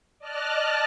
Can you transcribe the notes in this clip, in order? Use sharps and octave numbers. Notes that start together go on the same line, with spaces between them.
D5 D#5 A5 F6 F#6